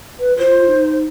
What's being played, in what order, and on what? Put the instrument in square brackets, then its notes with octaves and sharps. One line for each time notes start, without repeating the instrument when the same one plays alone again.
[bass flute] B4
[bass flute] F4 [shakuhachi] C5
[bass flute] D#4